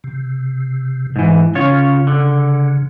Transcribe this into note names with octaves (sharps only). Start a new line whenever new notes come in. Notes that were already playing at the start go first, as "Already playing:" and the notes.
C3
G#2 E3
C#3 C#4 F4 C#5
D3